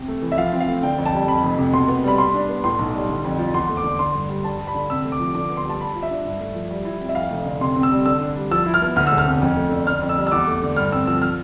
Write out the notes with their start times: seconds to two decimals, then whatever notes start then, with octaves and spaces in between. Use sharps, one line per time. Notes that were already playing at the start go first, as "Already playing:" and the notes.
Already playing: C3
0.08 A3
0.22 E3
0.32 E5
0.37 F3 F5
0.53 C4
0.61 F5
0.68 A3
0.83 D3 G5
0.98 F2
1.06 A5
1.13 G3
1.28 F2 B5
1.43 F1
1.59 C3
1.73 B2 C6
1.88 B3
2.04 G3 B5
2.18 G3 C6
2.34 D4
2.49 B3
2.64 A2 C6
2.79 B1
2.94 G3
3.09 D3
3.24 F2
3.39 F3
3.54 E2 C6
3.69 A3
3.77 D6
3.84 D3
3.99 D3 C6
4.14 G2
4.29 G3
4.44 G2 A5
4.59 G3
4.67 B5
4.75 D3
4.90 C3 E6
5.05 A3
5.12 D6
5.20 F3
5.35 D3 D6
5.50 B3
5.57 C6
5.65 G3 A5
5.80 G3 B5
5.95 F4
6.03 E5
6.10 D4
6.25 G2
6.40 A3
6.55 F3
6.71 G3
6.85 E4
7.01 C4
7.09 E5
7.15 F2 F5
7.30 F1
7.46 D3
7.61 C3 C6
7.76 C4
7.83 E6
7.91 G3
8.06 D3 E6
8.21 D4
8.36 G3
8.51 F3 E6
8.66 E4
8.74 F6
8.82 B3
8.96 D2 F6
9.07 E1 E6
9.18 F6
9.26 C3
9.41 F2
9.57 A3
9.72 D3
9.87 D3 F6
10.02 F2
10.09 E6
10.17 G3
10.27 E6
10.32 E2 D6
10.47 A3
10.63 D3
10.76 G2 F6
10.92 C4 E6
11.07 F3 E6
11.22 F6